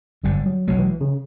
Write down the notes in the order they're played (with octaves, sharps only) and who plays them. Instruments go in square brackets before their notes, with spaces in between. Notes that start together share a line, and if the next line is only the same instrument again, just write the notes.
[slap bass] G1 F#2 D3 [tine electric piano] G3
[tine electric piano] F#3
[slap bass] B1 B2 G#3 [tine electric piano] F#3
[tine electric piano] E3
C#3